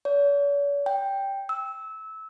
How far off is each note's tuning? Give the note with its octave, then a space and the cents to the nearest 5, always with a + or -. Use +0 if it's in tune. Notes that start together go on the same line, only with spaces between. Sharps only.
C#5 +45
G5 +5
E6 -20